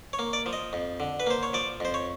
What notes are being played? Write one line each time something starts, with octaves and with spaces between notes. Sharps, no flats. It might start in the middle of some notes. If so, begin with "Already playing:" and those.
C#5
A#3
D5
F3
D#5
F2
D3
B4
A#3 C5
C#5
F3 D5
F2 C5
C#5